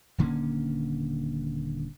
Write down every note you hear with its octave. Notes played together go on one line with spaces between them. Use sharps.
D#1 D3 A#3 C#4